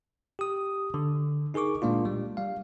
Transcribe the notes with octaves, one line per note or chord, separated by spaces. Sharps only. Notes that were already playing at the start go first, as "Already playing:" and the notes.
G4 D#6
D3
D#4 G#4 A#4 C#6 D6
A#2 G#3 A#3 D4 F4
G3
G3 F5